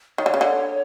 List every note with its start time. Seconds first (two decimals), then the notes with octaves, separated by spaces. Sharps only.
0.18 D#3 C#5
0.26 D3
0.34 C#3
0.41 D3